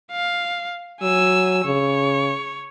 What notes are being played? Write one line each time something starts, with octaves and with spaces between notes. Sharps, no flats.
F5
F#3 G#5 E6
C#3 C#5